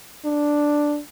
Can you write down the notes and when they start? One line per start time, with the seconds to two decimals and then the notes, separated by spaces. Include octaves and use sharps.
0.25 D4